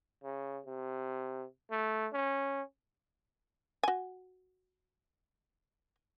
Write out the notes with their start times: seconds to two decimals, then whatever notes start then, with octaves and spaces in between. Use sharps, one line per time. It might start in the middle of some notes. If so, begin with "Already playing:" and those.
0.24 C#3
0.66 C3
1.71 A3
2.13 C#4
3.83 F#4 G#5